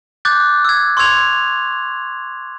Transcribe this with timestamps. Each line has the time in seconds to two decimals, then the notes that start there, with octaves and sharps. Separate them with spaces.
0.25 D6 F#6 G6 A6
0.65 E6 G#6
0.97 C6 C#6 E6 G#6 F7